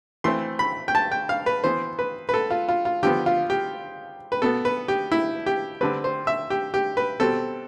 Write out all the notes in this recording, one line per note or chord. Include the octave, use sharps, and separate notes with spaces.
E3 A3 C4 C6
B5
G5
A5
G5
F5
B4
E3 B3 C5
B4
B4
A4
F4
F4
F4
D3 F3 B3 G4
F4
G4
B4
B2 B3 A4
B4
G4
E4
G4
D3 G3 C4 B4
C5
E5
G4
G4
B4
B2 G3 C4 A4